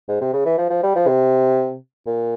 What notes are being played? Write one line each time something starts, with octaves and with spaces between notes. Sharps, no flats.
G#2
C3
C#3
E3
F3
F3
G3
F3
C3
A#2